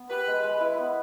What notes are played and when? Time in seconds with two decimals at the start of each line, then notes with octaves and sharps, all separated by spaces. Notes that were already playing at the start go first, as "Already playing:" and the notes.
Already playing: B3
0.10 G4 B4
0.27 G#3
0.44 G#3 B4
0.60 E4
0.78 B3